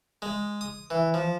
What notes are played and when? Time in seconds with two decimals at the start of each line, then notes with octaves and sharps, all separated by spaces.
0.22 G#3
0.61 D#6
0.90 E3
1.14 F3